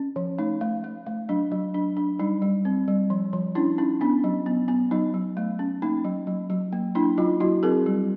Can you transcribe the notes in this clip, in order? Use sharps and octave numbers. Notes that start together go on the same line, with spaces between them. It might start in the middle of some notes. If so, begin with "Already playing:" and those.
Already playing: C#4
F3
A3 D#4
A3
A3
A3
F#3 D4
F#3
D4
D4
G3 D#4
G3
C4
G3
F3
F3
C#4 D4 E4
C#4 D#4
B3 D4
F#3
B3
B3
F#3 D#4
F#3
A3
C#4
A#3 D#4
F#3
F#3
F#3
A#3
A#3 D4 E4
F#3 D#4 F4
F#3 E4 F#4
C4 G#4 A#4
G3